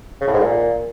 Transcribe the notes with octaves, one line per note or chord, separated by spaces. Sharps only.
C#3
A2
G#2
A#2